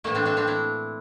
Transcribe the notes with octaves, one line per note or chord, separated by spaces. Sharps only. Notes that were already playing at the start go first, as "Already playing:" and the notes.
A2 E3 A3 A#3
C4 D4
C4 D4
C4 D4
D4 E4